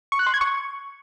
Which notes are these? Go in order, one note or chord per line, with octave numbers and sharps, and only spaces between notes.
C#6
F#6
C6
G#6
C#6